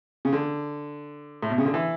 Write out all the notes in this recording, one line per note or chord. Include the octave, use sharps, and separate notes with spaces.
C#3
D3
A2
B2
C#3
D3
E3